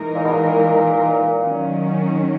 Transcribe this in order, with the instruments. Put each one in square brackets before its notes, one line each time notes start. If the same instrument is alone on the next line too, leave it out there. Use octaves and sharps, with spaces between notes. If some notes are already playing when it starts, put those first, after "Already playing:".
Already playing: [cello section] E3 G#3 D#4 A#4
[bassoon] A#2
B2
A#2
[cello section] D#3 F#3 C#4